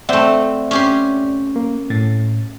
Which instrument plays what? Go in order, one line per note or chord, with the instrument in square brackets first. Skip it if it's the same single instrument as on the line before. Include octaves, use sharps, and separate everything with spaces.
[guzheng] A3 C4 [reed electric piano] D5 E5 F#5
[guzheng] C#4 G4 C6
[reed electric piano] A#3
A2 A6